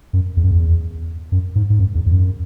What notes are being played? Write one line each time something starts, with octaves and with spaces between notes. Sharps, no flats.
F#2
E2
F#2
E2
F#2
G#2
G#2
F#2
E2
E2
F#2